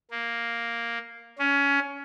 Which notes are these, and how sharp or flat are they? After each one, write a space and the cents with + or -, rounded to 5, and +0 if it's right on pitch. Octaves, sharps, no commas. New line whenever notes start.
A#3 +0
C#4 +20